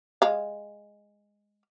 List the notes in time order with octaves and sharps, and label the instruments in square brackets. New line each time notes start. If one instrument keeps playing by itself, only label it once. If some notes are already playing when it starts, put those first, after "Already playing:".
[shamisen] G#3 F5